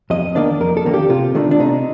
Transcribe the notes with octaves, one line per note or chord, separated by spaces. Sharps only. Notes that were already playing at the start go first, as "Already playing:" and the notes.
F2 D#5
D#3 A#3 D4 D5
F2 A#4
A4
D#3 A#3 D4
G4
C3 F4
D#3 A3 D4
D4
C3 D#4